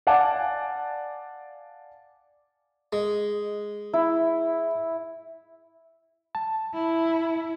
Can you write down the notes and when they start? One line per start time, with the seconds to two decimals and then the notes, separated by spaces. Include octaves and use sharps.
0.07 D5 F5 F#5 G#5 A5 D6
2.93 G#3
3.94 E4
6.35 A5
6.74 E4